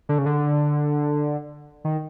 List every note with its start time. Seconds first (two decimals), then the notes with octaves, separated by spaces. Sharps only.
0.09 D3
0.18 C#3
0.26 D3
1.84 D#3